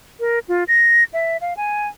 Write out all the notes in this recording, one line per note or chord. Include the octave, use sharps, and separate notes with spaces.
A#4
F4
A#6
E5
F5
G#5